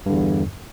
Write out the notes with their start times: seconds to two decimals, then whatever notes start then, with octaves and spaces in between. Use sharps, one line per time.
0.06 G2
0.09 D3
0.13 E2